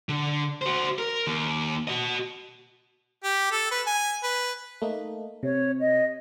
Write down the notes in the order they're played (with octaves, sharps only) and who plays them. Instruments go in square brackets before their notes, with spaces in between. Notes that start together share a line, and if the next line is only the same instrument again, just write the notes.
[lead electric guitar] D3
F#4 C5
A#4
D#2
F#4 D#5
[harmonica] G4
A4
B4
G#5
B4
[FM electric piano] A3 A#3 D#4
[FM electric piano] C3 [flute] C#5
[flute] D#5